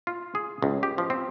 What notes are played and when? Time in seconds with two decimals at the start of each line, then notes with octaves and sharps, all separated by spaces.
0.07 F4
0.35 G#4
0.62 C#2
0.83 G4
0.98 F3
1.10 C4